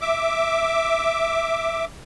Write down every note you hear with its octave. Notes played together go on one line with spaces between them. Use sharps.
E5 D6